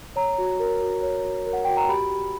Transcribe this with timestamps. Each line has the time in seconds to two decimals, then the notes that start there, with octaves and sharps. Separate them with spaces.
0.16 C#5 A#5
0.38 F#4
0.60 A#4
0.82 F#4
1.02 C#5
1.24 F#4
1.46 A#4
1.53 F#5
1.64 F#4 G5
1.77 A#5
1.89 G4 B5
2.10 G4